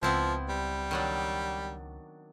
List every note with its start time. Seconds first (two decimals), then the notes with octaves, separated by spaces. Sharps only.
0.03 C#2 F3 B3 C4 E4
0.49 G3
0.91 D#3 F#3 D4